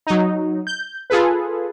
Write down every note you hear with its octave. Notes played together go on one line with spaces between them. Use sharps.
F#3 D#4
G6
F4 G#4 A4 B4